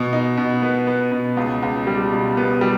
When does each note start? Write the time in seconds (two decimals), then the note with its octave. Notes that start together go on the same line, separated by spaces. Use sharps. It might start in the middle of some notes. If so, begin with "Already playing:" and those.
Already playing: B2
0.13 D#4
0.37 B2
0.62 B3
0.87 B3
1.12 B2
1.37 C#2
1.63 C#2
1.87 G3
2.11 B2
2.37 B3
2.61 G3